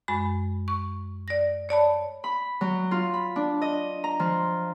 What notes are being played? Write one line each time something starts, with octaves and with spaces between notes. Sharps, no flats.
F#2 G#3 B5
C#6
D5 A#6
C#5 D5 A5 B5
B5
F#3
F4
B5
D4
D#5
A#5
F3